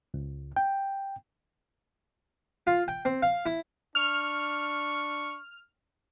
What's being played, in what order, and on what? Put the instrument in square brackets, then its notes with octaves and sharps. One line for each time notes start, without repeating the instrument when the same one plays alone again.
[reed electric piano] C#2
G5
[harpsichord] F4
G5
C4
F5
E4
[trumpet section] D4 C#6 [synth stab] F6